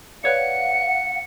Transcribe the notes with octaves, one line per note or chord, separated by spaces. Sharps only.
B4 C#5 D5 F5 F#5 C#7